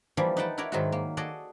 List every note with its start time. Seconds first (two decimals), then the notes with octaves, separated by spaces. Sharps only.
0.17 E3 F3 G3 A#3 E4
0.37 D#4 B4 F#5 G5 A5
0.58 E4 F#4 A#4 C#5 D5
0.72 G#2 D#3 F#3 G#3 E4 F#4
0.92 A#3
1.17 F#4 G#4 A4 D5 D#5